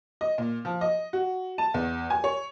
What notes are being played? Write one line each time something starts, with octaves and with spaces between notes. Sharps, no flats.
D#5
A#2
F3
D#5
F#4
A5
E2
G#5
C#5